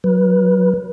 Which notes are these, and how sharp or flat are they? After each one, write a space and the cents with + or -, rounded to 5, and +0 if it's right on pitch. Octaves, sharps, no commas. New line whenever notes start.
F#3 +0 B4 -20